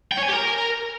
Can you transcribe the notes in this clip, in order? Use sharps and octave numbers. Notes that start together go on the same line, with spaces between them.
G5
C#5
G#5
G4
A#4